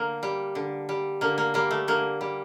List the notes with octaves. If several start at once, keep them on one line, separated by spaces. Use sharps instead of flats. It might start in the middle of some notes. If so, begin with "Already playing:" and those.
Already playing: D3 A#3
G3
D3
G3
D3 A#3
A#3
G3 A#3
A3
D3 A#3
G3